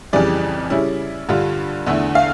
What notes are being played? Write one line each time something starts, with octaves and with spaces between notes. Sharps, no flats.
F2 C#3 E3 G3 D5
C#3 G3 C#4 E4
G2 D3 G3 D4 F4
E2 D3 A3 E4
F5